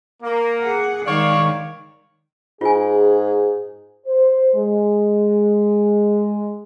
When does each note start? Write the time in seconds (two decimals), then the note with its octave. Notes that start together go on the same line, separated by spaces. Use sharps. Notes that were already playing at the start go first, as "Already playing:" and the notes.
0.23 A#3
0.60 G#4 F#5
1.06 D#3 G#3 C#5 D5 F5
2.61 G#2 F4 G#4 G#5
4.05 C5
4.54 G#3